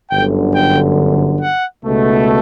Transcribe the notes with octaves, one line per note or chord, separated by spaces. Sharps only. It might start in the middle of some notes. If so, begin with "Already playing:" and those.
G1 F#2 D3 G5
G5
F#5
C#2 B2 A3